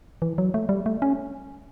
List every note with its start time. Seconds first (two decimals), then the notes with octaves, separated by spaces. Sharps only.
0.22 E3
0.38 F#3
0.54 A3
0.69 G3
0.86 A3
1.02 C#4